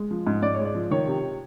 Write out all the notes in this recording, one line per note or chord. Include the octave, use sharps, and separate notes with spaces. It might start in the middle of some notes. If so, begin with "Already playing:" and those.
Already playing: G#3
F3
G#2
G#2 D5
G#3 C#5
D5
F3
D#3 C#5
C3